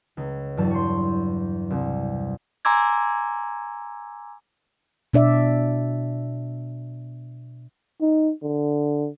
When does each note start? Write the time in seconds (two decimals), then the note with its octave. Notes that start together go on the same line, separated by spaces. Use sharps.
0.17 C#2
0.57 E2 G2 F#3 A5
0.70 C6 C#6
1.70 C2
2.65 G#5 A#5 C6 D6 E6 G#6
5.14 B2 D4 D5 E5
8.01 D#4
8.43 D3